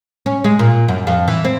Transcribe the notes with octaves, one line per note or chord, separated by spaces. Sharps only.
C#4
G#3
A#2
F#2
F2
E3
C4